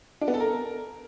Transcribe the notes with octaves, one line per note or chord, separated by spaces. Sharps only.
D4
B3
A4
A#4